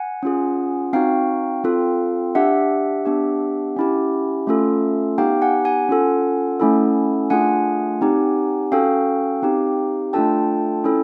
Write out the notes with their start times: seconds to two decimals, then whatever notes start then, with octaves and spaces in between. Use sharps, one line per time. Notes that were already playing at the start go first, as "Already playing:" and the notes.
Already playing: F#5 G#5
0.23 C#4 F4 G#4
0.93 C4 D#4 F#4 F5 G5
1.64 C4 F4 A4
2.35 D4 G4 E5 F#5
3.05 B3 D4 G4
3.77 C#4 E4 G4
4.47 A3 C#4 F4 A4
5.18 B3 D#4 G4 F5 G5
5.41 F#5 G#5
5.65 F#5 G#5
5.89 C#4 F4 A4
6.60 A3 C#4 E4 A4
7.30 A3 D4 F4 G#4 F#5 G#5
8.01 C4 D#4 G4
8.72 C#4 F#4 A4 F5 G5
9.42 C4 D#4 G4
10.13 A3 D4 F4 A4 G5 A5
10.84 C#4 E4 A4